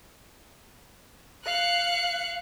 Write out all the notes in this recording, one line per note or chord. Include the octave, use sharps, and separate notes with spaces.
F5 F#6 C#7